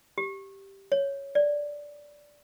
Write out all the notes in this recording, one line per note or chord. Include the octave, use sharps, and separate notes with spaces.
G4
C#5
D5